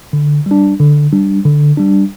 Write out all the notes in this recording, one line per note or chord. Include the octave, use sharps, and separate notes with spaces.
D3
G3 D4
D3
G3 D4
D3
G3 D4